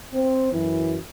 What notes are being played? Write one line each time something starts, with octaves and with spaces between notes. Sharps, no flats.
C4
F#2 E3